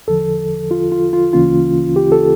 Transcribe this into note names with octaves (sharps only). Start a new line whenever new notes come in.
E2 D3 F3 A4
F4
F4
F4
D2 C#3 E3 A#3 C#4 F4
G4
A4